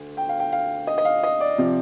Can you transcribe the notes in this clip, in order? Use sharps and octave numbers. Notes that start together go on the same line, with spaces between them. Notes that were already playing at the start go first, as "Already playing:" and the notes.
Already playing: D2
G5
F5
G5
F5
D#5
D#5
F5
D#5
D5
C3 F3